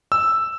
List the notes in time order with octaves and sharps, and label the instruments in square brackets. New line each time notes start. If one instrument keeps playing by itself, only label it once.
[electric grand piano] E6